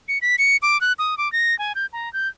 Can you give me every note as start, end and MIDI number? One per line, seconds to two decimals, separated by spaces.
0.08 0.18 97
0.22 0.36 95
0.39 0.57 97
0.62 0.79 86
0.81 0.93 90
0.99 1.17 87
1.18 1.31 86
1.33 1.57 94
1.59 1.73 80
1.75 1.86 91
1.93 2.11 82
2.13 2.28 91